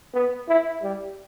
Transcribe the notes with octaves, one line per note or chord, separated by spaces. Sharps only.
B3
E4
G3